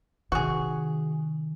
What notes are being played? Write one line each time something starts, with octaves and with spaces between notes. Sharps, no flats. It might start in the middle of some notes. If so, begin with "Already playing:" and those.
C3 D#3 F#4 G#4